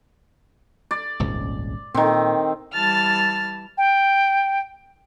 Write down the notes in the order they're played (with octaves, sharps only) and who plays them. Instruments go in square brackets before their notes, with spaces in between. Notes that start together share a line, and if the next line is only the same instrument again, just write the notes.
[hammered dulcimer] D5
[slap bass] D#1 G#1 C#2
[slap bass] A#2 [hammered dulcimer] D#3 C4
[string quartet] E3 G3 A5 F6 A6
[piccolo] G5